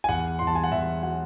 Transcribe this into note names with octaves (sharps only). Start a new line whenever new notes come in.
G#5
E2 F#5
E2 C6
A5
G#5
F#5
E2 E5
F#3 F#5